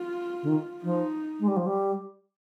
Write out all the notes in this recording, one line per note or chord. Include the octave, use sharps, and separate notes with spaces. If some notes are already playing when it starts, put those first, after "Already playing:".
Already playing: F4
D3
D#3
F3 D#4
G#3
G3
F3
G3